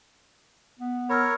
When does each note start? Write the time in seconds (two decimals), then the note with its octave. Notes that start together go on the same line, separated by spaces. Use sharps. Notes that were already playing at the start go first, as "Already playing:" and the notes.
0.80 B3
1.10 A#4 C#5 B5 E6 F6